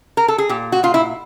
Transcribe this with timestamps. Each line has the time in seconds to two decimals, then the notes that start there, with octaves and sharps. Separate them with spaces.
0.17 A#4
0.28 A4
0.38 G#4
0.49 A#2 G4
0.72 F#4
0.83 A#2 F4
0.94 E4